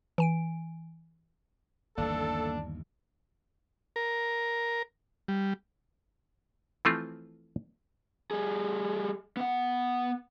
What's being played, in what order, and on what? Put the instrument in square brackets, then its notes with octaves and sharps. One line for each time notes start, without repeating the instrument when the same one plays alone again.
[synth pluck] E3 G#5 D7
[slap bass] G1 D#2 E3 [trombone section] A2 A4 [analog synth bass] A#3 [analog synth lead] D4
[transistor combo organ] A#4
G3
[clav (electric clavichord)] E3 F3 A3 C4 F4
[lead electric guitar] G3 G#4
B3 F#5